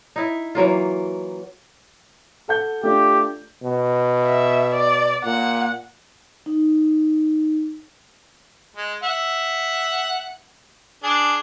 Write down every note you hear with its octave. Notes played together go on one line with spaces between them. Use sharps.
D#4 E4
E3 F#3 A#3 F4
A4 F#5 G6
A3 D4 F4 G4
B2
E5
D5
A#2 F#5
D#4
G#3
E5 F#5
D4 G#4